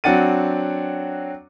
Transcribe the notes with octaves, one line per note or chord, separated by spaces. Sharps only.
F#3 C4 D4 F#5 A6 D#7